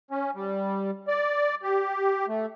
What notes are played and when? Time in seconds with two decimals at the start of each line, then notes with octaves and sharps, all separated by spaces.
0.11 C#4
0.35 G3
1.08 D5
1.63 G4
2.28 A3